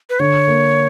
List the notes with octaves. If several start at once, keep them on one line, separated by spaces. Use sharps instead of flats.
B4
D3 C#5
A#3